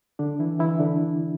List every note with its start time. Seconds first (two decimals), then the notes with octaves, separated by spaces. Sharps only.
0.19 D3 D4
0.39 E3 E4
0.59 E3 E4
0.79 D3 D4